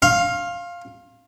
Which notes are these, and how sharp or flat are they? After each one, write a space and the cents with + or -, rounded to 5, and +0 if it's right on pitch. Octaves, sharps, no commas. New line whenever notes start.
F5 +0 C6 +35